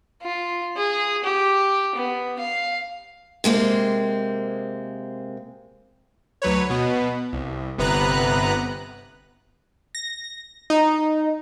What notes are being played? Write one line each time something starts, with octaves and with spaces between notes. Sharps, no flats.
F4
G#4
G4
B3
F5
C3 G#3 A#3 C4
D2 F#3 B4 C#5
B2 B3
C2
G1 C3 B3 B4 A#5 F#6
A#6
D#4